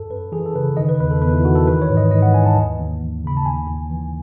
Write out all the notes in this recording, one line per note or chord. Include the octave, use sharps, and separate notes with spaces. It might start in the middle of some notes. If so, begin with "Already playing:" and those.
Already playing: F#2 A4
F#2 B4
E3 G#4
A4
C#3 B4
D#3 D#5
B4
E2 B4
A4
E2 B4
E4
D#3 F#4
A4
E3 B4
C#5
G#2
D#5
G#2 D#5
F#5
E3 G#5
A5
D#2
D#2
E3
C#3 B5
A5
D#2 G#5
D#2
E3